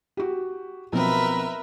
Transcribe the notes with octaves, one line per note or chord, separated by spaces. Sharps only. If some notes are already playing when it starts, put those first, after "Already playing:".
F#4 G4
B1 F3 C4 A#4 B4 E5